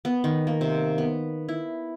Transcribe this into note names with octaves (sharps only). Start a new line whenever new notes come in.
B3
D#3
A#3
C3
B3
E4